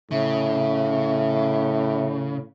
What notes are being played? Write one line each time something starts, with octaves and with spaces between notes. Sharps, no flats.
A2 C#3 E5